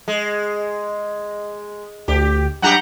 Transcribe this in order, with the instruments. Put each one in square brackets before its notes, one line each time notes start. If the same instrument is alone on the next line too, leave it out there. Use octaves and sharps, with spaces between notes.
[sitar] G#3
[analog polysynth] D2 [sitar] G4
[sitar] F#2 F#4 G4 [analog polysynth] F#5 A#5 G6